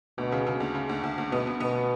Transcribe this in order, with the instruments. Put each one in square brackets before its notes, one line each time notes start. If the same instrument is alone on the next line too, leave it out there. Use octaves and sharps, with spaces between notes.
[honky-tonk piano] D2 [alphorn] B2
[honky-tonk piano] C#3
C#3
D2
C#3
D2
D2
D2
[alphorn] B2 [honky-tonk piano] B3
[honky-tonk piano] B3
[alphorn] B2 [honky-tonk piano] B3